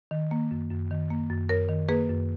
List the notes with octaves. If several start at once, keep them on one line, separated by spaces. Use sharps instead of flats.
D#3
A#3
F#2
F#2
D#3
A#3
F#2
F#2 A#4 C#5
D#3
A#3 G#4 B4
F#2